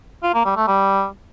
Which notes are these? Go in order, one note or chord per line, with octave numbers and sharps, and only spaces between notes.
F4
A#3
G3
A3
G3